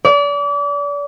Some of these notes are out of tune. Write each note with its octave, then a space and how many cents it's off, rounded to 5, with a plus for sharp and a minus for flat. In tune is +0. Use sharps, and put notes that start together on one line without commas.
D5 -35